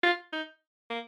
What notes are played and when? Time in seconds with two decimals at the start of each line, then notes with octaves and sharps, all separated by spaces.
0.03 F4
0.33 D#4
0.90 A#3